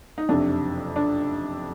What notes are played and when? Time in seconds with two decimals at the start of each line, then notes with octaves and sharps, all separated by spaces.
0.18 D#4
0.29 F#1 F2 C3 D4
0.96 D4